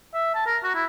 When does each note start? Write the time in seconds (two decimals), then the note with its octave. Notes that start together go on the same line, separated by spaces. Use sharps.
0.14 E5
0.35 A5
0.46 A#4
0.64 F#4
0.75 E4